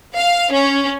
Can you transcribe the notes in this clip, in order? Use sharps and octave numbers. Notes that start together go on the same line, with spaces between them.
F5
C#4